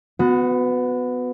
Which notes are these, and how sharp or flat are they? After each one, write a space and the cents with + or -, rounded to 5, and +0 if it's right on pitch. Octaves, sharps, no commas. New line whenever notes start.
B3 +20 F#4 -20